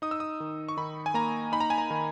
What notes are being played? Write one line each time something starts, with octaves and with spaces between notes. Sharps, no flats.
D#4 D#6
E6
D#6
D#3
C#6
D#3 B5
G#5
A#3 A#5
D#4 B5
A#5
G#5
A#5
D#3